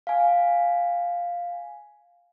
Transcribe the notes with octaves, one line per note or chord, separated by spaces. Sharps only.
F5 G#5